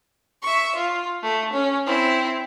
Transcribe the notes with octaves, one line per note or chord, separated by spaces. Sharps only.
E5 C#6
F4
A3
C#4
C4 E4